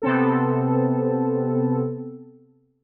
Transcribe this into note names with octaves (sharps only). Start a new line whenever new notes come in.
C3 B3 C4 A4